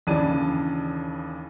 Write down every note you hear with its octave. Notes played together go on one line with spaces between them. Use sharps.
D#2 C#3 E3 D4 A5 D#7